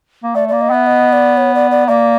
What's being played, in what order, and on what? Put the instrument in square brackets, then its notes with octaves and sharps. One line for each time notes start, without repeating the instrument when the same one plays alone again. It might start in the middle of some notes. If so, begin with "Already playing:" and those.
[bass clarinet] A#3
[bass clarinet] A3 [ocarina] D5
[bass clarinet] A#3 [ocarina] D5
[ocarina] D#5
[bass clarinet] B3 [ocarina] E5
[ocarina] D#5
D5
C#5
D5
D5
[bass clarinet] A#3 [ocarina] D5